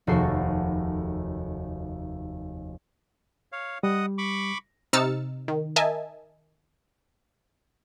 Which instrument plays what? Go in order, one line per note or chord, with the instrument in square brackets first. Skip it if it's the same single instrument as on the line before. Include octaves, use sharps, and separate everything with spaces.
[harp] F1 D#2 F#4 A4 C#6 C7
[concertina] C#5 F5
[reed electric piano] G3 [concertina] D#5 F#5 D#6
[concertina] B5 C#6 D6
[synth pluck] C3 D#4 E6 F6 A6 C#7
D#3
A#4 D#5 E5 G#5 A5